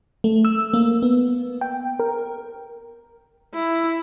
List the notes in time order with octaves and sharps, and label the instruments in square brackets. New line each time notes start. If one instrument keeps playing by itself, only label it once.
[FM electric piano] A3
E6
A#3
B3
G5
A#4
[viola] E4